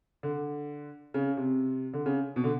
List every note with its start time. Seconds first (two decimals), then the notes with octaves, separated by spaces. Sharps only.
0.23 D3
1.14 C#3
1.37 C3
1.94 D3
2.06 C#3
2.36 B2
2.44 D3